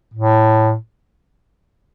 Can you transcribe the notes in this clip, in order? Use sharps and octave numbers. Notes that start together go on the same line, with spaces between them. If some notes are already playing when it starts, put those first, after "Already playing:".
A2